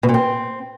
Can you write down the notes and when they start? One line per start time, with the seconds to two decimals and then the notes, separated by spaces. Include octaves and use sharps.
0.03 B2
0.09 A#2
0.14 C4